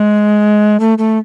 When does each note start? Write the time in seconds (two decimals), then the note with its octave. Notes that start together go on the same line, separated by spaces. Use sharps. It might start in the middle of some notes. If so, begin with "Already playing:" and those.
Already playing: G#3
0.80 A3
0.98 A3